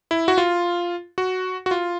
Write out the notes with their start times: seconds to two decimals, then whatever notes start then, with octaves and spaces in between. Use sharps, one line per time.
0.11 E4
0.28 F#4
0.38 F4
1.18 F#4
1.66 F#4
1.71 F4